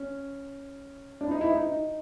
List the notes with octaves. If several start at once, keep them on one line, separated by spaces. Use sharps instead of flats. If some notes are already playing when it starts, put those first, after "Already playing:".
Already playing: C#4
D4
E4
D#4
E4
D#4
D#4